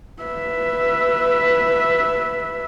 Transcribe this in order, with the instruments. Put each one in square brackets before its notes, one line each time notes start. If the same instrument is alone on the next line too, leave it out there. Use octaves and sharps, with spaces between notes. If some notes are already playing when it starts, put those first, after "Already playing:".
[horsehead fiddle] B4 E5